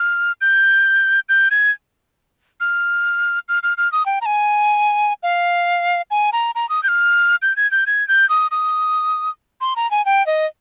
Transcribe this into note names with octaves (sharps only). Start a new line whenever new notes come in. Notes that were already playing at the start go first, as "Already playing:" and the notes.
Already playing: F6
G6
G6
G#6
F6
F6
F6
F6
D#6
G5
A#5
G#5
F5
G#5
A#5
A#5
D#6
G6
F6
G6
G#6
G6
G#6
G6
D#6
D#6
C6
A#5
G#5
G5
D#5